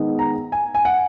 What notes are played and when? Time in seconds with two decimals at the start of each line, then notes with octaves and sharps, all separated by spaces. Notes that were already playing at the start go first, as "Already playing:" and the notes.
Already playing: D#3 G#3 B3 D#4
0.19 A#5
0.52 G#5
0.75 G#5
0.85 F#5